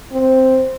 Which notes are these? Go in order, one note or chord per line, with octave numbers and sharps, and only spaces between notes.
C4